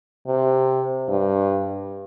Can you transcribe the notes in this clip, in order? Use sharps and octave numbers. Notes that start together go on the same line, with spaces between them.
C3
G2